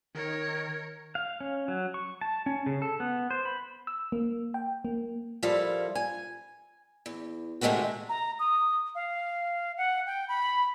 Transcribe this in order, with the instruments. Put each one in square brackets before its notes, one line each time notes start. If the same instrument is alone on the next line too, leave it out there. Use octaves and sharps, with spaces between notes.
[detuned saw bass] D#3 [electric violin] A#4 C#5
[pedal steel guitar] F5
C#4
F#3
C#6
A5
C#4
C#3
A4
B3
C5
B5
[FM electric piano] E6
A#3
G5
A#3
[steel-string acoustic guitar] F3 G3 E4 F4 A4 A#4
G#5
E2
C3 D#3 G#3 A3 C4 F#4
[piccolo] A#5
D#6
F5
F#5
G5
B5